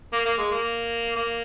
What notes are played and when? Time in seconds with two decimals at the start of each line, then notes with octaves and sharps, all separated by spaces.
0.13 A#3
0.26 A#3
0.38 G#3
0.51 A#3
1.16 A#3